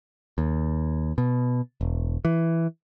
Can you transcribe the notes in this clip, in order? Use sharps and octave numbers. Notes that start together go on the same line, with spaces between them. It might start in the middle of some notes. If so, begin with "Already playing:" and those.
D#2
B2
E1
E3